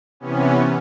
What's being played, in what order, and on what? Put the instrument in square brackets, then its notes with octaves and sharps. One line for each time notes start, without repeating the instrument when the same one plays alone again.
[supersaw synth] C3 E3 B3 C#4